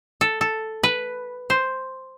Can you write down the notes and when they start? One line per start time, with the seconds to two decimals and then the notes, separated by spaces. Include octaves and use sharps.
0.21 A4
0.41 A4
0.83 B4
1.50 C5